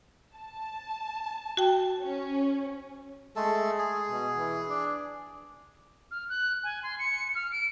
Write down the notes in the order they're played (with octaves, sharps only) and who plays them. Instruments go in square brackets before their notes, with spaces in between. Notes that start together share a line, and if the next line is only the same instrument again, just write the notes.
[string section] A5
[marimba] F#4 G5
[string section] C#4
[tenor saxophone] G#3 [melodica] A3 A4
[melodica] G#4
[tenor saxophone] B2
E3
D4
[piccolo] F6
F#6
G#5
C6
C#7
F6
D7